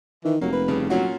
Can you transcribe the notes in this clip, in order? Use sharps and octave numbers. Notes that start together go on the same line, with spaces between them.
D#3 E3
F1 F#3 A#3
B4
G2 C#3
A#2 F#3 C#4 F#4